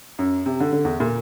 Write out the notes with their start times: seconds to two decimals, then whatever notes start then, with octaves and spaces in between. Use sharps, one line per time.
0.19 F#2
0.46 C3
0.60 D3
0.73 D3
0.85 E2
1.00 A#2